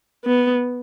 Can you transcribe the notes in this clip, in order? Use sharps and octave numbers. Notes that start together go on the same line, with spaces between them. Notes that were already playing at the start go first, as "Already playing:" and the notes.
B3